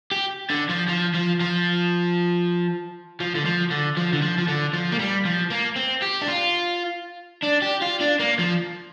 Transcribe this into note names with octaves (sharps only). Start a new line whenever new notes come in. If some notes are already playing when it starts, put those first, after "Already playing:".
G4
D3
F3
F3
F3
F3
F3
D3
F3
D3
F3
D3
F3
F3
D3
F3
A#3
G3
F3
A#3
C4
G4
D4
F4
D4
G4
F4
D4
A#3
F3